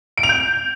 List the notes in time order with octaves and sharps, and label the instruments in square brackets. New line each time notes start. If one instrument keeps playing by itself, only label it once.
[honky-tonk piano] D7
F7
G6